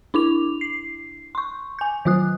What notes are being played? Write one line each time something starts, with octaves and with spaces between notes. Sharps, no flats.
D4 E4 D6 F7
C7
C6 C#6
G#5 G6
D#3 F#3 F4 D#6 F#6